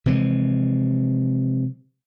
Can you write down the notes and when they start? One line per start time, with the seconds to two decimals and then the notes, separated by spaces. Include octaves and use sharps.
0.06 C3 E3 F3 G#3